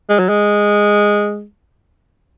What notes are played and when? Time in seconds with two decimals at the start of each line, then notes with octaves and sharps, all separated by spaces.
0.10 G#3
0.19 F#3
0.29 G#3